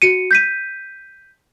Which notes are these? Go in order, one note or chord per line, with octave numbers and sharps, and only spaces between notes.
F#4 C#7 D#7
G6 B6 D#7